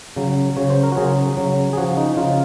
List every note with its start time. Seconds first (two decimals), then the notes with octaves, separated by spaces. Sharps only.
0.16 C#3 F#3
0.57 C#3 F#3 C#5
0.70 C5
0.83 A#4
0.92 F#4
0.97 C#3 F#3 G#4
1.37 C#3 F#3
1.73 G#4
1.77 C#3 F3 F#4
1.97 D#4
2.17 C#3 F3 F4